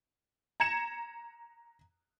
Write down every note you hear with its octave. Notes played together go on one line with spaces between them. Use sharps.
A#5 G#6 C#7 E7